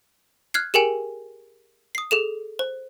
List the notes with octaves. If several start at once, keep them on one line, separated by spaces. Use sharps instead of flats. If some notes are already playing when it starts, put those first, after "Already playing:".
F6 F#6 G#6 C7
G4 G#4 A#4 G5 G#5
D#6 C7
G#4 A4 E7
C5